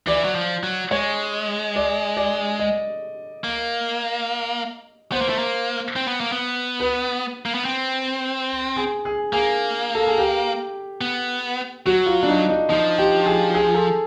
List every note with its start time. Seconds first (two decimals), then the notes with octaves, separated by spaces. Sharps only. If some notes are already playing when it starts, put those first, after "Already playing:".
0.07 E3 D5
0.24 F#3
0.35 F3
0.63 F#3
0.91 G#3 C#5
1.76 D5
2.17 D5
2.59 D#5
3.44 A#3
5.12 B3 C5
5.21 A#3
5.29 A3
5.39 A#3
5.96 C4
6.08 B3
6.21 A#3
6.32 B3
6.80 B4
7.46 A#3
7.55 B3
7.65 C4
8.76 G#4
9.05 G#4
9.33 A#3 G#4
9.95 A4
10.07 G#4
10.18 G4
11.01 B3
11.86 F#3 F#4
12.06 F4
12.23 D4
12.28 D#4
12.49 D#4
12.69 F3 D#4
12.98 G4
13.26 G#4
13.54 G#4
13.74 A4